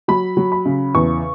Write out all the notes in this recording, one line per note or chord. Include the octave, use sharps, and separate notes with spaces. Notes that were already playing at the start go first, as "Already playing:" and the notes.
F#3 B5
F#3
B5
C#3
E2 C#6